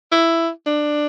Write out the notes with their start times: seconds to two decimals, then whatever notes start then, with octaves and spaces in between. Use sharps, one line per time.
0.12 E4
0.66 D4